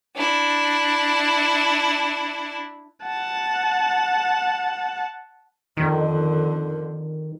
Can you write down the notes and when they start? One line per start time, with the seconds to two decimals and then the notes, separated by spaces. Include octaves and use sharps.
0.16 D4 E4
3.04 F#5 A5
5.77 F2 D3 D#3